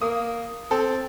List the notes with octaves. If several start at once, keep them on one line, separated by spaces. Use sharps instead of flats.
A#3 D#6
C4 A4